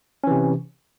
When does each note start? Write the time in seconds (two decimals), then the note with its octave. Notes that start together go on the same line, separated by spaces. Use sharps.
0.24 C#4
0.27 E3
0.31 C3